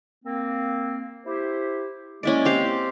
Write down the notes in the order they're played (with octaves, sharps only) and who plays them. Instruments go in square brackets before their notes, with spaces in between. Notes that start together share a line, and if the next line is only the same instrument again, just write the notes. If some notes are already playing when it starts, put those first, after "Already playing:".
[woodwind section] A#3 C4
E4 G4 C5
[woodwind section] G#3 A#3 [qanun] C#4 E4 D5
[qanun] C4 G4 F5